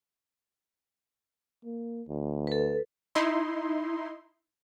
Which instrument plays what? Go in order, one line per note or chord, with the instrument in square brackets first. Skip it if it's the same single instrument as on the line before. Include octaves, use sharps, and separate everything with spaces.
[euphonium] A#3
D2
[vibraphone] A4 B4
[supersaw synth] D#4 E4 C6